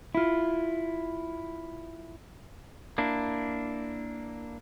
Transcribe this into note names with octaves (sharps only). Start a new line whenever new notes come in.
E4 F4
A#3 D4 E4